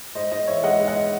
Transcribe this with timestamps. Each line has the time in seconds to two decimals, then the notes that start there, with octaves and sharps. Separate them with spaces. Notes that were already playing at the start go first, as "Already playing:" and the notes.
0.15 G#2 C5 D#5
0.31 G#2 C5 D#5
0.47 E3 C#5 E5
0.63 G#3 D#5 F#5
0.80 G#2
0.88 D#5 F#5